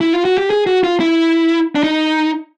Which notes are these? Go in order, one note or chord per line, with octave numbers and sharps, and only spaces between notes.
E4
F4
F#4
G4
G#4
F#4
F4
E4
D4
D#4